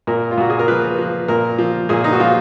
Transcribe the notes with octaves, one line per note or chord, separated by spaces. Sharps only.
A#2 A#4
F4
A#2 F#4
G#4
A#4
F3 B4
F3
A#2 A#4
F3
A#2 G#4
D#4
F#4
F3 F4